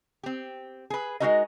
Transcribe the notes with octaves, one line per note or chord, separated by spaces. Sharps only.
C4 G4
G#4 B4
G#3 A3 D#4 F#4 A#4 D#5